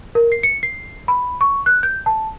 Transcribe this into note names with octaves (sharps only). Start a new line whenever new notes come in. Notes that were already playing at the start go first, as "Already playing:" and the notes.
A#4
C7
C#7
C7
B5
C#6
F#6
G6
A5